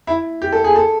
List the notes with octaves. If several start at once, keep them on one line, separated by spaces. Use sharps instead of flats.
E4
G4
A4
G#4
A4